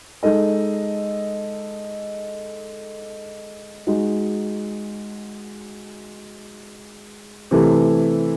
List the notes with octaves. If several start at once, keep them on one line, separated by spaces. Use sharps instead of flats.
G#3 D#4 A4 D#5
G#3 D#4 F#4
C3 E3 A3